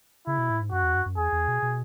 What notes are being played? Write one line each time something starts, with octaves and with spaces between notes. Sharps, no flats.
C#3 E4
B2
A2
G#2
F#2 F#4
E2
F#2
F#2
E2 G#4
E2
B2
B2